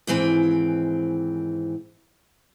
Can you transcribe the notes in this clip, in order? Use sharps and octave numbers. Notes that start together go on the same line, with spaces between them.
D#2 G#2 E3 C4